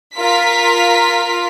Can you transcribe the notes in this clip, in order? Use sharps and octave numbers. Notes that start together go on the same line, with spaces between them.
F4 A#4 B6